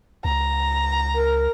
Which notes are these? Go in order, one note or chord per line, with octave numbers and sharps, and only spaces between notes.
C#2 A#5
A#4